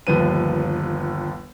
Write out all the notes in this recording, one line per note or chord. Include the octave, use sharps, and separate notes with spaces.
G1 D#2 F3 B4 D#7